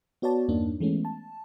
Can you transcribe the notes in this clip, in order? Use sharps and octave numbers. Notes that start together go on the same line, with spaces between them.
B3 F#4 C#5 D5 A5
E2 G2 A#3 D4 D#4
E3 G#3 A3 B3 C#4
A5